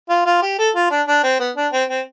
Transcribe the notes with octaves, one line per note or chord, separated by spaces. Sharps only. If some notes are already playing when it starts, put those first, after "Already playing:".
F4
F4
G4
A4
F4
D4
D4
C4
B3
D4
C4
C4